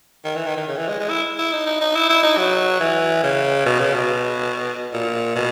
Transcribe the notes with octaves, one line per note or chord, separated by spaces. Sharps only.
D#3
E3
D#3
D#3
C#3
E3
G#3
G#3
E4
E4
D#4
D#4
D#4
E4
E4
D#4
F#3
E3
C#3
B2
C#3
B2
A#2
B2